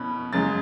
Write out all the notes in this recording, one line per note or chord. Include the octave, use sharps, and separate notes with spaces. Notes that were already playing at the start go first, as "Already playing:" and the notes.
Already playing: B2 C#4 B5
F#2 C#3 G#3 A6